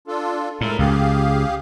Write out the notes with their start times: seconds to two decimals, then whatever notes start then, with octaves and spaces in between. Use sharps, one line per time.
0.07 D4 F4 A4
0.61 A2 G#3 A4 A#4
0.79 C#2 G4 G#4 F5